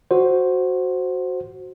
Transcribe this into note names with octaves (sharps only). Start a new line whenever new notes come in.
F#4 C5